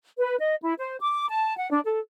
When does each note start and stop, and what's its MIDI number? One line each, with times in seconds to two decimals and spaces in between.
0.18 0.35 71
0.40 0.55 75
0.63 0.74 64
0.80 0.96 72
1.01 1.28 86
1.29 1.56 81
1.58 1.68 78
1.71 1.80 62
1.85 1.99 69